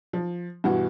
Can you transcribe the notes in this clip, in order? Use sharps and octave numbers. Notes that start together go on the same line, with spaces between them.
F3
G2 B2 E3 F#4